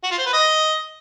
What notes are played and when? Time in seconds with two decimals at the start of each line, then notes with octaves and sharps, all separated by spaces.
0.03 F#4
0.11 F4
0.18 C5
0.26 B4
0.33 D#5